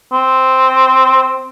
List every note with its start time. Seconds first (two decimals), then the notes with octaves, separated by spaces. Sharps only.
0.13 C4